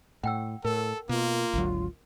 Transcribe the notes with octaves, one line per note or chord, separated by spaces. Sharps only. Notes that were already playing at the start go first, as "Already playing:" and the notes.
A2 F#5 G5 E6
A2 A4 A#4
B2 A#3 F4
G#1 D2 F#3